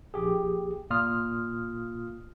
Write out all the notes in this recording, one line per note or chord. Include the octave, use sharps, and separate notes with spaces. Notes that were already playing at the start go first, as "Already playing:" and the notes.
A#1 G4 G#4
A#2 F4 D#6 F6